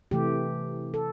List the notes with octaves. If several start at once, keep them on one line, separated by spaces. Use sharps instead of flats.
C3 E3 A3 G4
A4